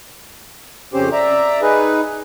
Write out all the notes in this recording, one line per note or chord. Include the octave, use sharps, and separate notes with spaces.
F2 C#3 C4 C#4 G4 C5
D5 E5 A#5
D#4 G#4 B4